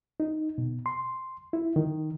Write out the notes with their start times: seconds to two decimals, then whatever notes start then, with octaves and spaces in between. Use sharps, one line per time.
0.20 D#4
0.58 B2
0.86 C6
1.53 E4
1.76 D#3